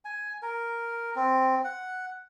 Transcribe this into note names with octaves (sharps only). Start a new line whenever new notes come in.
G#5
A#4
C4
F#5